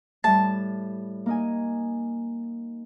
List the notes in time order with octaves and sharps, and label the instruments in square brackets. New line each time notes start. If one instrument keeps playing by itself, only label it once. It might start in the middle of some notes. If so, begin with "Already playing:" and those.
[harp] A2 G3 [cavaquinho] A5
[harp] A#3 D#4 G#5